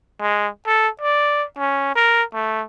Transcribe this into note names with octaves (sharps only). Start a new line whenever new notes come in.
G#3
A4
D5
C#4
A#4
A3